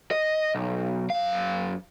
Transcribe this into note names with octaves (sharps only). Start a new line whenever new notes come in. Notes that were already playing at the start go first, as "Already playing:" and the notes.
D#5
B1
F#2 F5